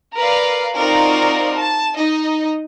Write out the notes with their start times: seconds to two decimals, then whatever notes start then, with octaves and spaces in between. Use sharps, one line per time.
0.15 A#4 B4 D5 F5
0.76 C4 D#4 F4 F#4 A#4 D5
1.57 A5
1.95 D#4 D#5